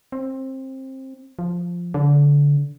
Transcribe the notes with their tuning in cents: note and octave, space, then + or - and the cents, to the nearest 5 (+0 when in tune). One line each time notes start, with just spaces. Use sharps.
C4 +20
F3 +0
D3 -25